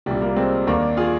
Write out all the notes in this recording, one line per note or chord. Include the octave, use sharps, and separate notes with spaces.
C2 A#2 G3
G3 A#3
G#3 C4
D#2 D#3 A#3 D4
F4 G#4